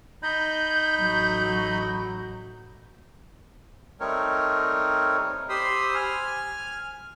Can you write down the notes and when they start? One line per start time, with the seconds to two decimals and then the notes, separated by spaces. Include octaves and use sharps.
0.23 D#4 D#5 B5 G6
0.97 A1 F#3
4.00 G3 A3 C4 D#4 A#4 C#5
5.49 G4 C5 B5 C6 D#6 E6
5.95 G#5 F6